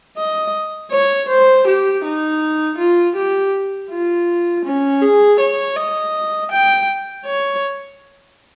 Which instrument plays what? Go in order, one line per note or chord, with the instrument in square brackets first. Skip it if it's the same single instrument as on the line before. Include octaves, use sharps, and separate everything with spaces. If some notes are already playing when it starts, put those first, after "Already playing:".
[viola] D#5
C#5
C5
G4
D#4
F4
G4
F4
C#4
G#4
C#5
D#5
G5
C#5